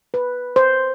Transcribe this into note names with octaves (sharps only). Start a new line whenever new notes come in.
B4
C5